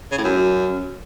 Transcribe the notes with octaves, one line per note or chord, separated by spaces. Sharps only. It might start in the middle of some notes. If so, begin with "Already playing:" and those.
C#3
A2
F#2